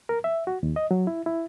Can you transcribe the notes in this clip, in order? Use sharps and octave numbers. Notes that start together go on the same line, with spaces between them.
A#4
E5
F#4
D#2
D#5
F#3
E4
E4